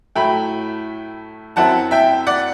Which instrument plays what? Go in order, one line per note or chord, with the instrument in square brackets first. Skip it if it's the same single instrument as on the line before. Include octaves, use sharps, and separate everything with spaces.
[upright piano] A2 F#3 A3 E4 G5 B5
F#2 F#3 C4 E4 F#5 A5
E5 G5
D5 F#5